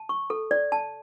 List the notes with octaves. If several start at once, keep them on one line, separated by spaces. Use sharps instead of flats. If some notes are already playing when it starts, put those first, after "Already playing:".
Already playing: A5
C#6
A4
D5
A5